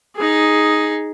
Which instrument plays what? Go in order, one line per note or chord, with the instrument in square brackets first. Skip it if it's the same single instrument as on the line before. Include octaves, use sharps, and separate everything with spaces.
[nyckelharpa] D#4 G#4